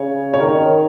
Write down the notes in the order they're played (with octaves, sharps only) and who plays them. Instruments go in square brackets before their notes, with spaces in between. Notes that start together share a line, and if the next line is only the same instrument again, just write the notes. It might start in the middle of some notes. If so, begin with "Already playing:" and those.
Already playing: [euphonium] C#3 [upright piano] C#5
[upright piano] C#5
[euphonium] D#3 [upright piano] A#4